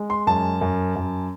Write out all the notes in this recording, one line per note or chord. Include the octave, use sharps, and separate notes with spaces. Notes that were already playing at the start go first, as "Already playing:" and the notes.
Already playing: G#3
C6
F#2 A5
F#2
F#2